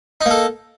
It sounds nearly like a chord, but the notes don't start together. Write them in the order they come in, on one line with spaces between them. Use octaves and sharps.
D#4 A#3 A4